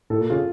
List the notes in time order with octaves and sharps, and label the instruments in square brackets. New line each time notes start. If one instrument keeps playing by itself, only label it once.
[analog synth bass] A2 [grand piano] A4
[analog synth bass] A#2
[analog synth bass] C#3 [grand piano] F4